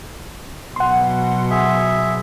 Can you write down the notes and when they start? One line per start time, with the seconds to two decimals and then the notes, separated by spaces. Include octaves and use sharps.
0.76 B2 F#3 F#5 C6
1.51 G#4 E5